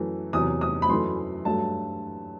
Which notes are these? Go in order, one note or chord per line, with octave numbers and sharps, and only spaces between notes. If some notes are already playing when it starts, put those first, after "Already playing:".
Already playing: F#2 E3 A3
E2 C3 F#3 D#6
D#6
B5
F#2 E3 A3 C6
G2 F#3 A3 A5